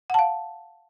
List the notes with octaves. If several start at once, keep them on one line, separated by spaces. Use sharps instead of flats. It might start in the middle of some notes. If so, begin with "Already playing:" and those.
F5 F#5 A5